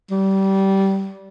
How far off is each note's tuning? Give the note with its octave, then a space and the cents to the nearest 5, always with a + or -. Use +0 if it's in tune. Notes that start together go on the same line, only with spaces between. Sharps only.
G3 -20